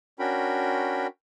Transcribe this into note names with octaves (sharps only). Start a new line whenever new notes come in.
C#4 D4 F#4 A#4 G5 B5